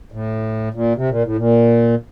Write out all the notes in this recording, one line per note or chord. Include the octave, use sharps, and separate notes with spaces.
A2
A#2
C3
A#2
A2
A#2